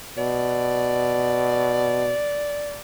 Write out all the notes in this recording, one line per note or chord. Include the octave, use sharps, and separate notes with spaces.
B2 D5